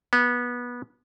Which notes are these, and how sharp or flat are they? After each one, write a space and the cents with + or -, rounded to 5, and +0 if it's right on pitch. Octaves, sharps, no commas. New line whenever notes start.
B3 -20